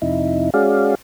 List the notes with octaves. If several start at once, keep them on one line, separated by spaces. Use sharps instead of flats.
F2 C3 D#4 E4
G#3 C#4 F#4 G#4 D5 F5